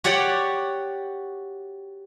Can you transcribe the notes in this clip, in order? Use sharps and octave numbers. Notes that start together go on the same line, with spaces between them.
F#4 G4 C#5 D5 F#5 G5